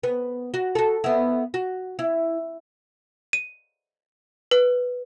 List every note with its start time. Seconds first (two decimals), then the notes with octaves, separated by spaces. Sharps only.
0.03 B3
0.54 F#4
0.75 F#4 A4
1.04 B3 E4
1.54 F#4
1.99 E4
3.33 D#7
4.51 B4